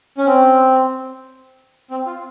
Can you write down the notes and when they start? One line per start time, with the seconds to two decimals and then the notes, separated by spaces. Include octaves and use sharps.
0.18 C#4
0.26 C4
1.91 C4
2.06 F4